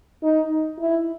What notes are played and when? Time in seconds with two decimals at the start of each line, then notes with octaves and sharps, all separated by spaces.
0.23 D#4
0.79 E4